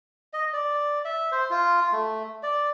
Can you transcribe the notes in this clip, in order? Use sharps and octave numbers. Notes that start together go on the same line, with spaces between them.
D#5
D5
E5
C5
F4
A3
D5